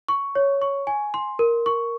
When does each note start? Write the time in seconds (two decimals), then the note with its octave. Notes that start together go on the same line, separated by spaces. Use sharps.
0.08 C#6
0.35 C#5
0.62 C#6
0.87 G#5
1.14 C6
1.39 A#4
1.66 C#6